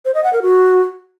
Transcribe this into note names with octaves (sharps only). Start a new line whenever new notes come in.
C5
D#5
F#5
A#4
F#4